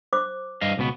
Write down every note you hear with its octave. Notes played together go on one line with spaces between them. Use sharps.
C5 D6
G2 D#5 F5
C#2 B2 B3